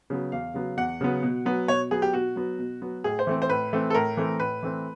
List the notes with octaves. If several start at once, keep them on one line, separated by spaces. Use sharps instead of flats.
C#3 F#3 B3
E2 F5
C#3 F#3 B3
E2 F#5
C#3 F#3 B3
B2
F#3 B3
B2 C#5
F#3 B3 G#4
G4
B2 F#4
F#3 B3
B2
F#3 B3
A2 G#4
C5
E3 A3 C4
C5
A2 B4
E3 A3 C4
A4
A2 A#4
E3 A3 C4
A2 B4
E3 A3 C4